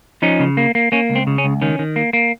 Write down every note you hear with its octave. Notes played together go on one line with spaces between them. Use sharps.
F3 C#4 D#4
C#3
A#3
A#3
A#3 C#4
C#2
C4
C#3
C#4
C#2
D#3 C#4
D#3
A#3
A#3